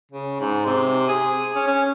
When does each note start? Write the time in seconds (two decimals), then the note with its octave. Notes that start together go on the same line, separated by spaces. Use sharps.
0.12 C#3
0.40 G#2
0.66 C3
1.08 G#4
1.55 C#4
1.67 C#4